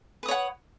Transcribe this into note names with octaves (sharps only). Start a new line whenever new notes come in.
B4 C#5 F#5 D#6